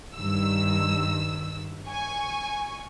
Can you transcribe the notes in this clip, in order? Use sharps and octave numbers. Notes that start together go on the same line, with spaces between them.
G2 D#3 E6
G#5 C#6